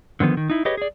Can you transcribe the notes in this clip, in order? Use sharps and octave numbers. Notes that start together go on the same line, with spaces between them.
D3 D#3 F3 B3
D#3
D#4 E4
G4 G#4 B4 C#5 D#5
G#4 D5